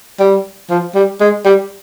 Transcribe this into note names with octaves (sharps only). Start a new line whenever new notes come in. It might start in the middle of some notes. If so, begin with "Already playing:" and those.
G3
F3
G3
G#3
G3